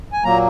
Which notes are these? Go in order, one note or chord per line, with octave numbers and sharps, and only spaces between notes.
G#5
A#2 F#3 A#3 A#5